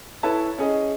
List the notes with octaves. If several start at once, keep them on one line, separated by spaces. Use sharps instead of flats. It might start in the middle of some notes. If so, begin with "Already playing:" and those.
E4 A4 B4 C#5 E5 A5
C#4 G#4 D#5